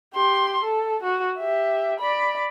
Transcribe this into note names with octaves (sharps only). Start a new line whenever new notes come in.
G4 C6
A4
F#4
G4 E5
D5 B5